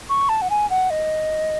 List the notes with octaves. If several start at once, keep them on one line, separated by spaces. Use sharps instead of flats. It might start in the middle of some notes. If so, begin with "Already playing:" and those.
C#6
A5
F#5
G#5
F#5
D#5